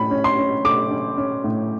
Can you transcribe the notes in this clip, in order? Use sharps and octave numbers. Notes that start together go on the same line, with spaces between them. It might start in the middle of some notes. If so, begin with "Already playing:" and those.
Already playing: A2 C#4 B5
C#4
C6
C#4
A3 D6
C#4
C#4
A2